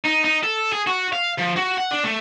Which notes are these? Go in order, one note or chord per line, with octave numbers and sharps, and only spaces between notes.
D#4
D#4
A4
G#4
F#4
F5
F3
F#4
F#5
D4
A3